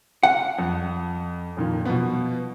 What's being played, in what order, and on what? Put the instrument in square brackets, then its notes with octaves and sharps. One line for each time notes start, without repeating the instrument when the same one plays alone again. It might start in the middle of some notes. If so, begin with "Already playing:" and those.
[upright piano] F5 [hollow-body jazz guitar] F#5
[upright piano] F2
F2 A#2 D#3
B2 F3 B3